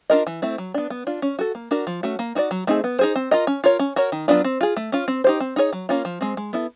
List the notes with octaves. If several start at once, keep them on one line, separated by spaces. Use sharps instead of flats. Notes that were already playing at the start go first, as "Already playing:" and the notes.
D4 F4 A#4 D#5
E3
A3 C4 E4
F#3
B3 D4
B3
D4 F4
C#4
F#4 A4
A#3
D4 F#4 A#4
F3
A3 C#4 F#4
A#3
D#4 F#4 B4 D5
F#3
A3 C4 D#4 G#4
B3
D#4 G#4 C5
C4
F4 A#4 D#5
C#4
F4 A#4 C#5
C#4
F#4 A#4 C#5
D#3
F#3 B3 D4 F4
C4
F4 G#4
A3
C#4 F4
C4
D#4 G4 C5
C4
D#4 G#4 C#5
F#3
A#3 C#4 F4
F3
G#3 C4
G#3
B3 E4 A4